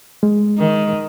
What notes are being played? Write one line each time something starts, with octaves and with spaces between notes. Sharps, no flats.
G#3
D#3